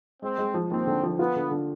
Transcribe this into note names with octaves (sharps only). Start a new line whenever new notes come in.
G#3 C4
G#3
F3
D#2 C4
D3
F3
B3 F4
D3
D3